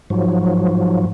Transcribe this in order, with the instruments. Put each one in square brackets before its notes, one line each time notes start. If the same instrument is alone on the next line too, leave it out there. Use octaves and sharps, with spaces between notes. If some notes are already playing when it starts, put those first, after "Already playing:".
[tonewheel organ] G#2 F3 F#3